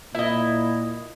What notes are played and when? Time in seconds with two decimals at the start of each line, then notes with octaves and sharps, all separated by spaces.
0.15 A#2 E4 D#5